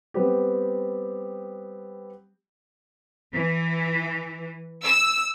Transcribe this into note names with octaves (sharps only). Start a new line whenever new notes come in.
G3 B3 C4 G4
E3
E6